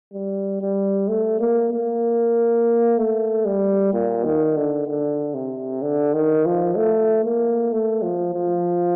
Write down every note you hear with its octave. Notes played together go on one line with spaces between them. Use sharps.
G3
G3
A3
A#3
A#3
A3
G3
A#2
D#3
D3
D3
C3
D3
D#3
F3
A3
A#3
A3
F3
F3